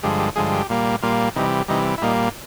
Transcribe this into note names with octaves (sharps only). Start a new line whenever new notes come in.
G2 D3 F3 G#3 G4
G4
G2 D3 F3 G#3 G#4
G4
A#2 G3 A#3
A#2 G3 A#3 F4
C3 E3 G3 D#4
C3 E3 G3 D#4
E4
A#2 G3 A#3 D#4